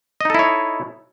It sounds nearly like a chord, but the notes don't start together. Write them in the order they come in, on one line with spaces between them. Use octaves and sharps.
D#5 D#4 A4 E4 C#5